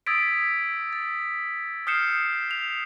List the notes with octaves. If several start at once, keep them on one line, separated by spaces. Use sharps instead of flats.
D#6 E6 G#6 A6 B6 D7
A6
D#6 F6 G6 C7 C#7 E7
F7